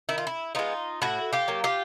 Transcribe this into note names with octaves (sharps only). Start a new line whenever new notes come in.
D#3 E4
F4
E4
G#3 B3 D#4 F4
A2 E4 F#4
F4 G4
F#3 A#3
F4 G4